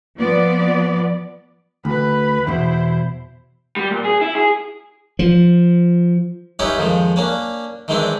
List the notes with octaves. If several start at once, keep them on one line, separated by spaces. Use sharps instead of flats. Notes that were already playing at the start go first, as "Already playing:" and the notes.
F3 B3 D5
D2 B4 B5
E2 B2 E4 C5
G3
A#2
G#4
E4
G#4
F3
C#4 D#4 E4 G4 B4 C#5
F2 D#3 F3 G#3
A#3 C#4 D4
D#3 E3 G#3 C4 D4 E4